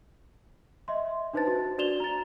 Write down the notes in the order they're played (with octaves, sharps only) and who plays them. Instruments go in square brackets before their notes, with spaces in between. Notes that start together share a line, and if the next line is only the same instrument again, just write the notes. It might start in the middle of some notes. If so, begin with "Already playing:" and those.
[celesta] D#5 E5 C6
D4 D#4 B4 C5 A5 A6
F#4
D4 F#4 D5 E7 F7 G7
A#5 A6